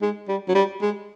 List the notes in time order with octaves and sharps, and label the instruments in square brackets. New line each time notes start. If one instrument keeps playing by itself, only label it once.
[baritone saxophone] G#3
G3
F#3
G3
G#3